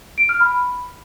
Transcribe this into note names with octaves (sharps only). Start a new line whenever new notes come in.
D7
F6
B5